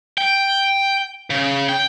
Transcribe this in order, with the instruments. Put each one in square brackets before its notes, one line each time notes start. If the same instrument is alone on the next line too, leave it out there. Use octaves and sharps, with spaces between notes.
[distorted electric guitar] G5
C#3
G5